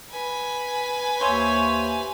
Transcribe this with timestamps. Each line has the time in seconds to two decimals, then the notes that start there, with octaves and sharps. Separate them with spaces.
0.11 B4 G#5
1.21 D#2 C5 C#5 E5